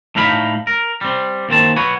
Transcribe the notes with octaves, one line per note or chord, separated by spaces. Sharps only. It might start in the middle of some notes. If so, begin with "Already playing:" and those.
A2 A3 D#4 F5 F#5 B5
A#4
G3 C4
D#2 A#3 C4 A5
F#4 B4 C#5